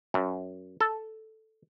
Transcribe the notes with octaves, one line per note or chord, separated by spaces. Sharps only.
F#2
A4